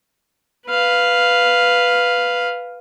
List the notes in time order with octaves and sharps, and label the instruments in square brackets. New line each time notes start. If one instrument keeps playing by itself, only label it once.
[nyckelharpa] B4 F5